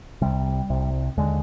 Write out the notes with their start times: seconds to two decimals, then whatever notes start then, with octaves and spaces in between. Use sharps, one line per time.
0.21 C2 C3 G3
0.70 C2 C3
1.17 D#2 D3 G#3